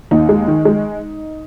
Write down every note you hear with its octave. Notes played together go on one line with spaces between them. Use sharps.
D#2 D#4
G#3
D#3
G#3